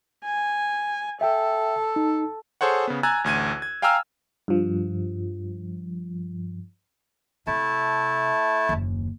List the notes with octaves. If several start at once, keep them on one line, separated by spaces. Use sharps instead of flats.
G#5
A4 E5 G5
D#4
G#4 A4 C5 C#5 F#5
C#3 B3
G#5 A#5 E6 F#6 G#6 A6
A1 D2 G#6 D#7
G#6
F5 G5 G#5 A#5 E6 F6
G2 F3
C3 A3 E4 A5
F#1 D#2